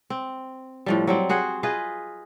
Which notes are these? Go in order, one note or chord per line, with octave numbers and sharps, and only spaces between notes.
C4
A2 F3 G3
F#3 G3 C4
F#4 G#4 C5 F#5
F4 G#4 B4 D#5